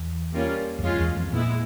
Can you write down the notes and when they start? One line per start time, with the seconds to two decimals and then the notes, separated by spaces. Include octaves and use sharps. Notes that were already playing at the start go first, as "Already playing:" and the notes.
Already playing: E2
0.33 G3 A#3 C#4 F4 A#4
0.79 E2
0.83 F2 G#3 C#4 F4
0.99 E2
1.16 F2
1.32 A#2 G#3 B3 E4